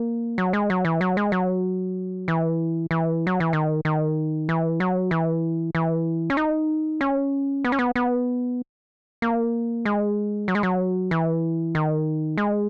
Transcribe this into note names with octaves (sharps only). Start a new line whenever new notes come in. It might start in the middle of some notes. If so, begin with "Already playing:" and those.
Already playing: A#3
F#3
G#3
F#3
E3
F#3
G#3
F#3
E3
E3
F#3
E3
D#3
D#3
E3
F#3
E3
E3
C#4
D#4
C#4
B3
C#4
B3
B3
A#3
G#3
F#3
G#3
F#3
E3
D#3
G#3